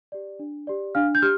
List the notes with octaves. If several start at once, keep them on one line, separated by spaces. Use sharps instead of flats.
G4 D5
D4
G4 D5
D4 F5 F6
G6
G4 F6